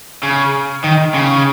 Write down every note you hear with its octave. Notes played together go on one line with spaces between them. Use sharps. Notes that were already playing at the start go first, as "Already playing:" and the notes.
C#3
D#3
C#3